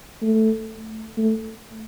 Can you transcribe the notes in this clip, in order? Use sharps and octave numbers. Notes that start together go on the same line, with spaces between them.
A3
A3